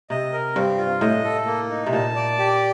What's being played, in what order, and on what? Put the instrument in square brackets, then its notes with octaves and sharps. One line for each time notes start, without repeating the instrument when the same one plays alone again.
[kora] C3 [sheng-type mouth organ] D#5
[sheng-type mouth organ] A#4
[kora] G2 [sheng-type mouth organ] C4
[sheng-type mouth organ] F4
[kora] A2 [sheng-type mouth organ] D#5
[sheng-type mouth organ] A4
A#3
D#4
[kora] C3
[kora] A#2 [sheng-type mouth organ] A5
[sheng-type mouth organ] D5
G4